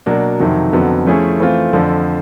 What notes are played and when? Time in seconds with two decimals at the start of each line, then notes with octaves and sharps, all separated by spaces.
0.06 B2 F#3 A#3 D4
0.40 F2 C3 D#3 F#3
0.73 F2 D3 F#3 B3
1.06 F3 A3 C#4 E4 G#4
1.40 E3 A3 C4 F4
1.73 F2 D3 F3